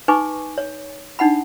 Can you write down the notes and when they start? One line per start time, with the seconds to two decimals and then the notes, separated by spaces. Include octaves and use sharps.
0.08 D#4 B4 G#5 C#6 D6
0.58 C#5
1.19 D4 D#4 F#5 B5